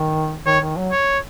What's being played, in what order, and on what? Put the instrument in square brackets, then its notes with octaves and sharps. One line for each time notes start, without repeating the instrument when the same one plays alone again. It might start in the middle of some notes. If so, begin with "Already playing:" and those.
Already playing: [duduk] D#3
[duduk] D#3 [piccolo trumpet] C#5
[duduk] D#3
F#3
[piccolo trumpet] C#5